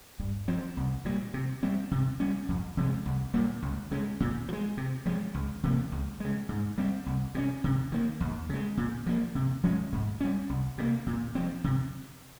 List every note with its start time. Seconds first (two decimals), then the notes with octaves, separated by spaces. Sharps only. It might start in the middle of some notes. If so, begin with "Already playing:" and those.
0.20 G2
0.48 F3 C4
0.77 C2
1.05 A#2 G3
1.34 C3
1.63 G3 C4
1.91 C3
2.20 G3 C#4
2.49 F2
2.77 C3 F3 G#3
3.05 C2
3.34 A#2 G3 A#3
3.62 C#2
3.91 C#3 G#3
4.20 A#2
4.48 F3
4.53 G#3
4.77 C3
5.06 F3 G#3
5.34 C#2
5.63 C3 F3 A#3
5.92 C#2
6.20 C#3 G#3
6.49 G#2
6.78 G3 C4
7.06 C2
7.35 C3 G3 C#4
7.64 C3
7.92 D#3 A#3
8.20 D#2
8.50 C#3 G#3
8.77 A#2
9.06 F3 A#3
9.35 C3
9.63 F3 G#3 C#4
9.92 G#2
10.21 G3 C#4
10.49 C2
10.78 C3 G3 A#3
11.07 A#2
11.35 F3 C4
11.64 C3